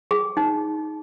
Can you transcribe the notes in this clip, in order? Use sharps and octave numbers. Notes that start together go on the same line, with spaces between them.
G#4
D#4